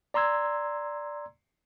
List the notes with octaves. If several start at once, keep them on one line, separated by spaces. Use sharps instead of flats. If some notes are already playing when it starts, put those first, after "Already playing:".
D5 A#5 C6 E6 G#6